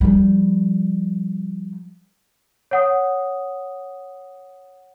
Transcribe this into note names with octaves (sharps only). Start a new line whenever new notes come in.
F3 G3
C#5 F#5 D#6